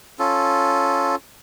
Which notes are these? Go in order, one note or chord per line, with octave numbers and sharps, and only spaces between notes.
C#4 F4 A4